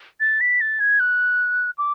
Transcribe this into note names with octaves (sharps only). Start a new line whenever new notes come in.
A6
B6
A6
G#6
F#6
D6